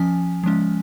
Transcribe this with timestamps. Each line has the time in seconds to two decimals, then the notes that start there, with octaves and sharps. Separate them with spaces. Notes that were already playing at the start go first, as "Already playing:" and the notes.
Already playing: F3 C#4 G#5
0.44 F3 G#3 C#4